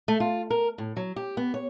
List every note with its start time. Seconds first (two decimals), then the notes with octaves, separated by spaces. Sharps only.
0.08 A3
0.20 F4
0.50 A#4
0.78 A2
0.97 F#3
1.16 G4
1.37 B3
1.54 C#5